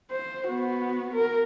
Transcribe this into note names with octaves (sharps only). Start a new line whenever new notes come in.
C5
B3 F#4
A#4